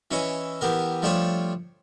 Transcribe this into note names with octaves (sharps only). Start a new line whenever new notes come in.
E3 C#4 E4 C#5 D#5
E3 B3 G4 A#4
F3 G3 A3 D4 F4 C#5